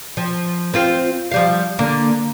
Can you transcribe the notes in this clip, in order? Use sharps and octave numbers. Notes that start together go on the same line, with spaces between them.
F3
C4 F4 C5
F3 G3 F5
D3 A#3